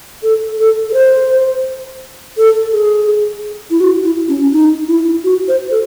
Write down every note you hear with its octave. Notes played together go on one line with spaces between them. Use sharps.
A4
A4
A4
C5
A4
G#4
E4
F#4
E4
C#4
D#4
E4
F#4
C5
A4